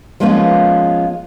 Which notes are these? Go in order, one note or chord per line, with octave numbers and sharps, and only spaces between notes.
F3 G#3 A#3 B3 C#4 F4